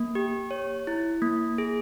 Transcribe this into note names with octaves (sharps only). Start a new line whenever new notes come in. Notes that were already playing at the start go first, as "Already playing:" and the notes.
Already playing: A#3
G4
C#5
E4
A#3
G#4